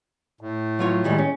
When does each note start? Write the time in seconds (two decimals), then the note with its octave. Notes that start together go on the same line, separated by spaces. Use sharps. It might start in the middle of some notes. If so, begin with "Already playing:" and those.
0.41 A2
0.79 F#3 F4 C#5
1.04 D#3 G3 G#3
1.18 C#4